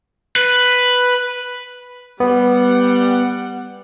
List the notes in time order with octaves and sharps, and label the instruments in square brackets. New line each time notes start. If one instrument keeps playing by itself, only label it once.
[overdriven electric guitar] B4
[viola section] G3 F#5 [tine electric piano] B3